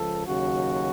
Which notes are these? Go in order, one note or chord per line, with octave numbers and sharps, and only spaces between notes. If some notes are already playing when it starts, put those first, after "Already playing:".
Already playing: C#2 F3 A4
D#2 C#3 F#3 F#4